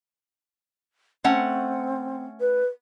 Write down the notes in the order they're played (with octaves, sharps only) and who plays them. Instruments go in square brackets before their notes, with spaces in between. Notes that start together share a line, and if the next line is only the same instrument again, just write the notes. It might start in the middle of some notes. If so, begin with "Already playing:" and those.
[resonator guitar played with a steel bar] A3 C#4 F#5 [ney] C4
[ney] B4